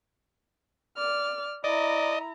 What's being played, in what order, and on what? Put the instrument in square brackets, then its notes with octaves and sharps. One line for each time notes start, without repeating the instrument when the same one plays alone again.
[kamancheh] D5 F6
[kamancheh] E4 A#5 [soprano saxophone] D5 [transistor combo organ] D#5